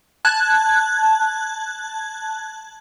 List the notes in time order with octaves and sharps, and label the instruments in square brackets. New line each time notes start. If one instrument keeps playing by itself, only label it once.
[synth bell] A5 F#6 G#6